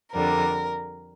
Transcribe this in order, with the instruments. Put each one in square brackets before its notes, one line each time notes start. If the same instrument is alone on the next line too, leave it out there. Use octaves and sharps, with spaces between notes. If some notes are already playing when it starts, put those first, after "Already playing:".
[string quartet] F2 D3 G3 A#4